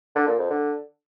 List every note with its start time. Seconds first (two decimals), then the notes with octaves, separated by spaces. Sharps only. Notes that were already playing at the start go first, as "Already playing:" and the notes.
0.16 D3
0.27 A#2
0.39 F2
0.50 D3